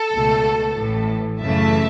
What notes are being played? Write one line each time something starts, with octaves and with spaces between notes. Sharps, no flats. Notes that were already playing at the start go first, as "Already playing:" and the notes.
Already playing: A4
C#2 B2 A3
A1 A2 E3
F#2 C#3 E3 A3 E5 A5